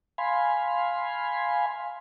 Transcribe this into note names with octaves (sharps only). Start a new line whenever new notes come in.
F5 G#5 B5 C6